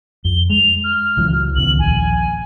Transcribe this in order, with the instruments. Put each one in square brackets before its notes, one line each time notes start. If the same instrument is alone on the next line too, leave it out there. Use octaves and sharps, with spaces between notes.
[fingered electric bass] F2 [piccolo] G7
[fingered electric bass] G#3 [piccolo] F7
[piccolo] F6
[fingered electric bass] C#2 E3 F#3
[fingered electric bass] C#2 B2 D#3 [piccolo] F#7
[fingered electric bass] D#1 A#1 [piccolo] G#5